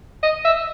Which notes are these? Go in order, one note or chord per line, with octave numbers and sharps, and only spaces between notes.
D#5
E5